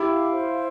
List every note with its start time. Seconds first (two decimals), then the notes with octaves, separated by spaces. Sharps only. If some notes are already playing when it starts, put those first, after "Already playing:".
Already playing: E4 G4
0.09 F5
0.33 C5